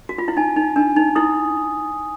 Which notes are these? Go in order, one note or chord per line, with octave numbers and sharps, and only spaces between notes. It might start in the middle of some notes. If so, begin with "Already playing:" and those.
F#4
F4
E4
D#4 G#5
D#4
D4 G#5
D#4
E4 D#6